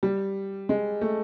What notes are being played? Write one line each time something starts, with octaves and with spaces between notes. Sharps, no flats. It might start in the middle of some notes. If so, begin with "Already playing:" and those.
G3
G#3
A3